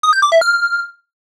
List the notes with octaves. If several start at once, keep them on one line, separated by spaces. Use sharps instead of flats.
D#6
G6
D6
E5
F6